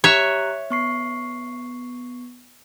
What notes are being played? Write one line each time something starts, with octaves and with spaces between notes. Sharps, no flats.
G4 C#5 E5 A#5 F#6
B3 C#6 C7